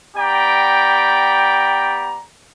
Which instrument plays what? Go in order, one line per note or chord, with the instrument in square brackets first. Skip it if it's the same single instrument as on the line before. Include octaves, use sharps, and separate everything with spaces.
[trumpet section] B3 G4 D5 G5 A#5